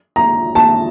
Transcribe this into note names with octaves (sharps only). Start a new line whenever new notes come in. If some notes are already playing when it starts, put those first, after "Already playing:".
A#5
A5